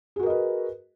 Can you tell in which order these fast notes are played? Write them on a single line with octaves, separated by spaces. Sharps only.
G#4 F#4 A#4 D#5 B4